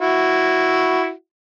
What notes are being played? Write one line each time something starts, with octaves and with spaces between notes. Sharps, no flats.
E4 F#4